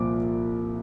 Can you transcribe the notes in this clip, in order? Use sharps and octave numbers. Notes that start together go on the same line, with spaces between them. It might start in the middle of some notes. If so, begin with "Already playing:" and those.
Already playing: C2 A#2 F3 D6